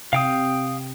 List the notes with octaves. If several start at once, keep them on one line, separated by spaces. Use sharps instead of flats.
C3 F5 G5 D#6